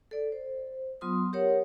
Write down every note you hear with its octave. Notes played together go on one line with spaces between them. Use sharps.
A4 D5
C5
F#3 B3 F4 C6 D#6
G4 A#4 C#5 F#5